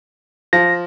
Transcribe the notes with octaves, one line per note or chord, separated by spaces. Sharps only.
F3 A#6